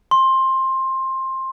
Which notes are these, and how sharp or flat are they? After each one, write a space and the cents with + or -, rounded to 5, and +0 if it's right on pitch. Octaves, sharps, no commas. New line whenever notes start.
C6 +15